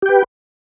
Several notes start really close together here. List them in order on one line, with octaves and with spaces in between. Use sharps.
G4 G5 B4